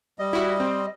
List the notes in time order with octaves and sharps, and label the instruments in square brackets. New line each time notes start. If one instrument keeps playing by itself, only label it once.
[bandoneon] G3 D#5
[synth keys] E4 F#4
C4